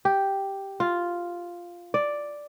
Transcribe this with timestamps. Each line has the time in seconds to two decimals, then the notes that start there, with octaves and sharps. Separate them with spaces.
0.05 G4
0.80 F4
1.94 D5